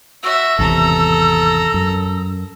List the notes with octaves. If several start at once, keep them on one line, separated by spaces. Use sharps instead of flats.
F#4 E5 E6
G#1 E2 C3 A4 A#5
F#2